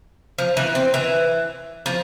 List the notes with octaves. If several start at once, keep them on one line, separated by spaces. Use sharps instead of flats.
F3
E3
C4
E3
F3